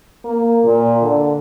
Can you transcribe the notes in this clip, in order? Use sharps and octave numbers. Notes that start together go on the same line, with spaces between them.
A#3
A#2
D3